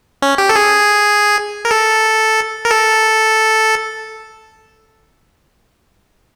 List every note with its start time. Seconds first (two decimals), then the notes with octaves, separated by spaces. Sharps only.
0.22 C#4
0.38 G4
0.49 A4
0.56 G#4
1.65 A#4
1.71 A4
2.65 A#4
2.71 A4